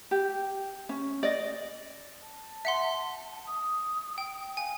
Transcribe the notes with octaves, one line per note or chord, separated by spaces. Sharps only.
G4
C#4
D5 D#5
A5
E5 F#5 C6
D#6
G5
F5 G#5